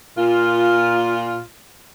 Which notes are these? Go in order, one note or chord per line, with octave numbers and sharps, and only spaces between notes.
A#2 F4